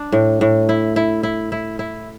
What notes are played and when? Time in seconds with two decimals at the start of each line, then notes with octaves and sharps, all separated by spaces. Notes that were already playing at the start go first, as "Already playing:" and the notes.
Already playing: D4
0.12 A2
0.41 A2
0.69 E4
0.96 E4
1.23 E4
1.52 E4
1.79 E4